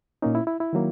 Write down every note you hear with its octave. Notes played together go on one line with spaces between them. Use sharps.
A#2 A#3 C#4 D#4
E4
E4
E4
D#3 F#3 A#3